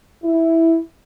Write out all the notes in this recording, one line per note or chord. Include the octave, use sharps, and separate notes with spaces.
E4